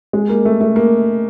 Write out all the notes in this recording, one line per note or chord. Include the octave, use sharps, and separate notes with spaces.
G#3
A#3
A3
A3
A#3